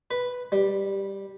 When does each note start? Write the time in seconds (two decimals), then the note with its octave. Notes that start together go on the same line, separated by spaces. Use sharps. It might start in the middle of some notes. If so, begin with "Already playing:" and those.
0.11 B4
0.52 G3